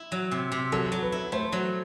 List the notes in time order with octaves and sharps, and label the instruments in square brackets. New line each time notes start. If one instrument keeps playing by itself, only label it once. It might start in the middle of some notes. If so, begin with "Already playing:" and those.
Already playing: [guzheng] E4
F#3
C3
C3
[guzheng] F#3 [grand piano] A4
[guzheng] F#3
[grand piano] B4
[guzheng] E4
[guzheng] A3 [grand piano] C5
[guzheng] F#3